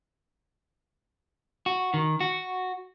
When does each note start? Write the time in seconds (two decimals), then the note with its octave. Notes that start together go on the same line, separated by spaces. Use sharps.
1.66 F#4
1.94 D#3
2.20 F#4